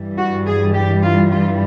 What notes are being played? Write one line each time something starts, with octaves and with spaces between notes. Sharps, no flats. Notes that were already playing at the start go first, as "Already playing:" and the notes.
Already playing: G2 E3 G3
F#4
G#4
G4
F4
F4